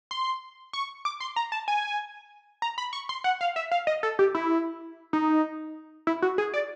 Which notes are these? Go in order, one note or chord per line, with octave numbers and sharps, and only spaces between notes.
C6
C#6
D6
C6
A#5
A5
G#5
A#5
B5
C#6
C6
F#5
F5
E5
F5
D#5
A4
G4
E4
D#4
E4
F#4
G#4
D5